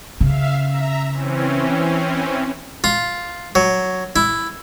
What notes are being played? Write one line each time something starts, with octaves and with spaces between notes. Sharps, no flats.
C#3 E5 F5
E5 A#5
E3 C4 C#4
F4
F#3
E4